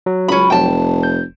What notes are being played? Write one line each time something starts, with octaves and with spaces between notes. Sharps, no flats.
F#3
C#2 C#4 B5
F1 G5 A5
G6